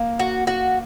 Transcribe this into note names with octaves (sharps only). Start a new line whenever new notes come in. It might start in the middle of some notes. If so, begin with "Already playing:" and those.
Already playing: A#3
F#4
F#4